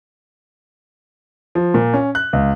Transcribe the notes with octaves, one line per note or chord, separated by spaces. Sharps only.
F3
A#2
C#4
F#6
C#2